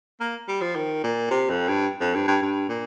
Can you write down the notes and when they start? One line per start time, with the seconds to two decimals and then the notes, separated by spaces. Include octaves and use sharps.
0.20 A#3
0.48 G3
0.61 F3
0.76 D#3
1.03 A#2
1.31 C3
1.50 F2
1.68 G2
2.00 F2
2.15 G2
2.28 G2
2.42 G2
2.69 A#2